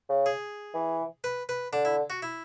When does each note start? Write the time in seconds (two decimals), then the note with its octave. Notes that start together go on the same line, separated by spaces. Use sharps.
0.09 C#3
0.26 G#4
0.74 E3
1.24 B4
1.49 B4
1.73 D3 D4
1.85 E4
2.10 F#4
2.22 E4